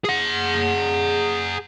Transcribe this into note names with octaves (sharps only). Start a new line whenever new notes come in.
G#4 F#5